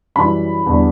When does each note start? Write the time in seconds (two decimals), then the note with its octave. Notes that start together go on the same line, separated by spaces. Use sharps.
0.16 F#2 E3 G3 B5
0.66 E2 D3 G3